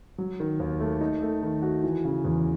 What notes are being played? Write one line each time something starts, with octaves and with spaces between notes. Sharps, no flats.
F#3
D#3
D#2
A3
D#4
A3
D#3
F#4
E3
C#3
E2